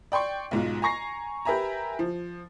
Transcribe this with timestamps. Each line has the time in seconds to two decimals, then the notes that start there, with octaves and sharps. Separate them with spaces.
0.12 D5 G5 C6 C#6
0.51 B1 G#2 F4
0.82 G#5 A#5 C#6 A#6 C7
1.45 G4 A#4 B4 E5 G#5 A#5
1.99 F3